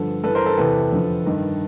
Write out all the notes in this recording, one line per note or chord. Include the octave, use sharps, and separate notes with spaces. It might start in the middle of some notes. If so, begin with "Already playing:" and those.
Already playing: G2 D3 F3 A4 B4
G2 E3 A4 B4
A#4 C5
A4 B4
E2 C3 E3 A4 B4
F2 D3 F3
G2 D#3